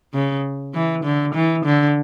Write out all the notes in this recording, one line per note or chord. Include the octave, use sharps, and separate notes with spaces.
C#3
E3
D3
E3
D3